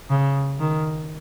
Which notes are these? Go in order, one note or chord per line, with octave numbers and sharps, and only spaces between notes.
C#3
D#3